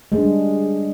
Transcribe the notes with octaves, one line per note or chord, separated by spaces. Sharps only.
G#3
D4
G3